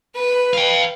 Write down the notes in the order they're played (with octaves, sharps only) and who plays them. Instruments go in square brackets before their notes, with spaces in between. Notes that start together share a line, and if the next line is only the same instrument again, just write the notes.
[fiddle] B4
[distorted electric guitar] F5 G5